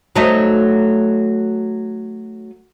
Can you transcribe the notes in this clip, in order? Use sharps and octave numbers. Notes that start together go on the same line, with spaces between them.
F#3 A3 D#4